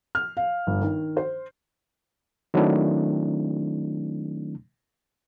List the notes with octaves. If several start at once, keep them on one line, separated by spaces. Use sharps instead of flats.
F6
F5
G1
D#3
C5
D#3 F#3 A3 C4 D4 E4